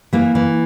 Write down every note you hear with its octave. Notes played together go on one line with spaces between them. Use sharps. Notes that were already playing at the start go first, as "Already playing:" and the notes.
E3 A#3
E3